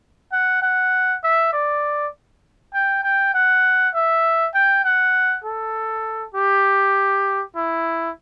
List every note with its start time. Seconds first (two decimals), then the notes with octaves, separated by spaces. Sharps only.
0.32 F#5
0.62 F#5
1.23 E5
1.53 D5
2.74 G5
3.03 G5
3.34 F#5
3.94 E5
4.54 G5
4.84 F#5
5.44 A4
6.34 G4
7.56 E4